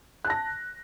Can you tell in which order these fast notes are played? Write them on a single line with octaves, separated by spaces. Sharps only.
F#6 A5 A#6